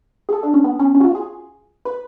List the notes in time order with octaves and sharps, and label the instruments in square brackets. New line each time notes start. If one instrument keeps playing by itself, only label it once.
[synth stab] G#4
A4
D4
C#4
B3
C#4
C#4
F#4
F4
G#4
B4